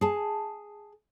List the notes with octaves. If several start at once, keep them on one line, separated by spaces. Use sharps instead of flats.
G#4 A5